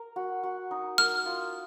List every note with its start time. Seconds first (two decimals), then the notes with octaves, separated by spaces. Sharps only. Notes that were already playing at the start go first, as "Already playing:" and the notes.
Already playing: A#4
0.16 F#4
0.43 F#4
0.71 D#4
0.98 A#4 F6
1.26 F4